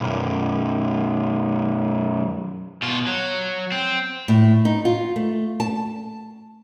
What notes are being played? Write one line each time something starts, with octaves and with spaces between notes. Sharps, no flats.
B1 F#2
B2 F4
F#3
C4
A2
D#4
F4
A3
A5